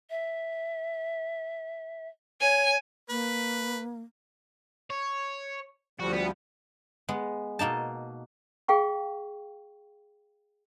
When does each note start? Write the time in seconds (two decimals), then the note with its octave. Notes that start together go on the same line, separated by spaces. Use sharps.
0.10 E5
2.41 C#5 G#5
3.09 A#3 B4
4.90 C#5
6.00 D2 F3 G3 F#4
6.14 B3
7.09 G#3 B3
7.59 B2 A#3 D#4 A5
8.68 G#4 F5 G5 C#6